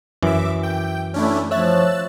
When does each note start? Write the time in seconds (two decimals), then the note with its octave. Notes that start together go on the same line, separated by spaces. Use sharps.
0.23 F#2 E3 E5 D6
0.63 G5
1.14 A3 C#4 D4 E4
1.51 F3 C#5 E5 E6 F#6 A6